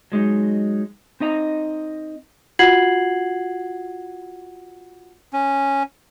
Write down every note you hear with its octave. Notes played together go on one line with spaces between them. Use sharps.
F#3 G#3 D#4
C4 D#4 D#5 A#5
F4 F#4 F#5 G#6 C7 F#7
C#4